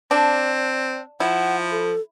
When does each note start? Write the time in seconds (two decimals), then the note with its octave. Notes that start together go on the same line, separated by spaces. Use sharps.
0.11 C4 D4
1.20 F3 E4 F#5
1.71 A4